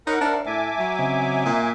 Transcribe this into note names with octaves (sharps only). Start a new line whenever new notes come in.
D#4 A#4 C#5 F#5 B5
D4 C5 D5 E5
A2 E5 G#5 A5 D6
F#3
C#3 C4 D#5
A#2